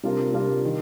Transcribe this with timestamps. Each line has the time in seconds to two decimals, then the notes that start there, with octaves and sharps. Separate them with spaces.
0.03 C3 G3 D4 F4 A#4
0.33 C3 G3 D4 F4 A#4
0.65 D#3